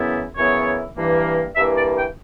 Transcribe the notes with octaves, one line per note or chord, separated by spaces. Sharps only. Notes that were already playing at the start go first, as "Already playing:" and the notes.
Already playing: F#2 C#3 E3 B3 E4
F#2 C#3 E3 B3 E4 C#5
G2 E3 A#3
G2 E3 A#3 E5
D5
G5